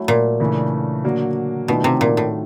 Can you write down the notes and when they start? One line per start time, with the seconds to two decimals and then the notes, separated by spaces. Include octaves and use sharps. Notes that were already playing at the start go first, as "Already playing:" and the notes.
Already playing: F#3 A3 C#4 E4
0.08 A#2
0.40 C#3 E3 A3 D4
1.04 D3 F#3 A#3 D4 F#4
1.68 B2 D#3 F#3 A3 D4 F4
1.84 C3
2.01 A#2
2.17 A2